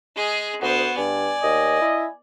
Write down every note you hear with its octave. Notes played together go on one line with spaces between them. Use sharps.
G#3 G#4
D2 B3 F#4 C5
G2 D5 G#5
D#2 D#5
E4